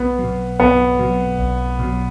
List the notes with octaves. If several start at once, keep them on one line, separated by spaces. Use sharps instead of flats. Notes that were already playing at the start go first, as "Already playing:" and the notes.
Already playing: B1 B3
F#3
B2
B1 B3
B2 F#3
B1
B2 F#3